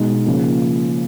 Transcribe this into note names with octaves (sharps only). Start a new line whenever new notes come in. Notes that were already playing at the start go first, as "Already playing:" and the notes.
Already playing: B2 G#3 D#4
C#3 F3 A#3 F4